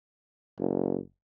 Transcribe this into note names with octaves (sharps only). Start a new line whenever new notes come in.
F#1